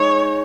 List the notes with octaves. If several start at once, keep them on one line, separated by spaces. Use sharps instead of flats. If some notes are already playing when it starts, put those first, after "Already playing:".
Already playing: G#3 D#4 C#5